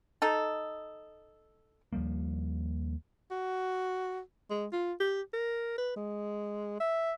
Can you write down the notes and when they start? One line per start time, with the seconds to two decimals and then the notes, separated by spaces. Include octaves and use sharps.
0.22 D#4 A4
1.93 D#2 F3 G3 A#3
3.31 F#4
4.50 G#3
4.72 F4
5.00 G4
5.33 A#4
5.78 B4
5.96 G#3
6.80 E5